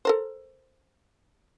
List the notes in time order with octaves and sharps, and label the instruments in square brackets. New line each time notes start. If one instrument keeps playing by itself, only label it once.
[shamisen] A4 A#4 C5